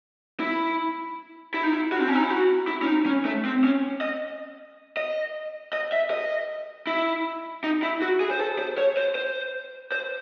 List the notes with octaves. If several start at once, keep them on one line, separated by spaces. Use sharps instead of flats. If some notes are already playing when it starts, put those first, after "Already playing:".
E4
E4
D#4
E4
F#4
C4
C#4
D#4
E4
F#4
E4
C#4
D#4
C#4
A3
C4
C#4
D#5
D#5
D#5
E5
D#5
E4
D#4
E4
F#4
G#4
C5
A4
C5
C#5
C5
C5
C5